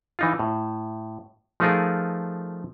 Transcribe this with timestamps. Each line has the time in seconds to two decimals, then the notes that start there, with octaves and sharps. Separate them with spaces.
0.19 E3 D#4 F4
0.39 A2
1.60 F3 A3 D#4 F4 G#4 A#4